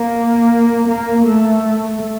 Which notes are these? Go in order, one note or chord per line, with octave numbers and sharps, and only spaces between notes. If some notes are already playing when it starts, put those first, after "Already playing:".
Already playing: A#3
A#3
A3